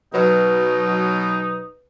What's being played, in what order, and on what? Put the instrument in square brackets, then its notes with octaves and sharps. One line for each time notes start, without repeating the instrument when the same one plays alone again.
[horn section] B2 F#3 [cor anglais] D#4 [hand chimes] B4